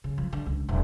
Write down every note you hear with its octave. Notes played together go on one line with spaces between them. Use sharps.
C#3
F3
D3
C#2
D#1